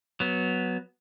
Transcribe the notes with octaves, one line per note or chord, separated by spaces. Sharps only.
F#3 B3